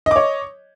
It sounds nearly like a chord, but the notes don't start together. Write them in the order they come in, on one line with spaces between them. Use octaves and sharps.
D#5 D6 C#5